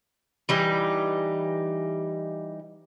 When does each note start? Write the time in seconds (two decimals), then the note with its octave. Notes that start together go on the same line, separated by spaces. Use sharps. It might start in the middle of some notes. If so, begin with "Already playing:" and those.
0.49 E3 G3 D#4